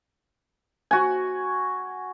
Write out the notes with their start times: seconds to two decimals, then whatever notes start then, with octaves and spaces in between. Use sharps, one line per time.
0.91 F#4 G#5